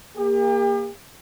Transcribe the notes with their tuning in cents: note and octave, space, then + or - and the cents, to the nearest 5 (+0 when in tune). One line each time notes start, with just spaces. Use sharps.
A#3 +0 G4 +40